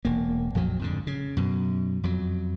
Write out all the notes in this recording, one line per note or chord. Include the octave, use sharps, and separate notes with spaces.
E1 A#3
A#1 F2 F3 F#3
F2 G#2 D3
C#3
F#2 B2
F2 F#3